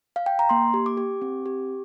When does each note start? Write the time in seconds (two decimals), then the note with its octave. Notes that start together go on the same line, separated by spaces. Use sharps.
0.16 F5
0.26 G5
0.39 A#5
0.49 A#3 C6
0.74 G4
0.86 D6
0.97 G4
1.22 C4
1.46 G4